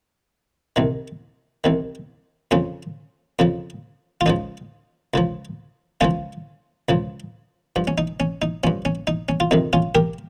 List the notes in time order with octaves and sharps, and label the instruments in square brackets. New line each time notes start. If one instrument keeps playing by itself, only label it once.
[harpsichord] C2 C3 D#3
C2 C3 D#3
F2 C#3 F3 C#4
F2 C#3 F3
F4
C#2 C#3 F3 D#4
C#2 C#3 F3
C#2 C#3 F3 C#4 F4
C#2 C#3 F3
G2 F3
C#4
D#4
C#4
D#4
G2 F3 C#4
C#4
D#4
C#4
F4
F2 C3 D#3 D#4
C#4 F4
G4 A#4